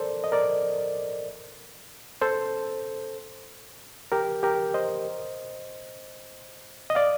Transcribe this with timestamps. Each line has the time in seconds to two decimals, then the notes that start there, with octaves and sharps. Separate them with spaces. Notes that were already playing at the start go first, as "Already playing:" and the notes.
Already playing: A4 A#4 C5 D5
0.24 D#5
0.32 A#4 D5
2.21 A4 C5
4.12 G4 A#4
4.43 G4 A#4
4.74 C5 D#5
6.90 D#5
6.95 D5 F5